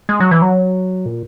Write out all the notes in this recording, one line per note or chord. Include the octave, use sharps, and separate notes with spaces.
G#3
F#3
E3
F#3
A#2